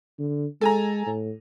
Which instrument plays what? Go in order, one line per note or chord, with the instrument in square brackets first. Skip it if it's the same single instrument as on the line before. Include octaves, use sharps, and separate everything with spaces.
[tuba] D3
[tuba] G#3 [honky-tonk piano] A4 G#5 A#5
[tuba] A2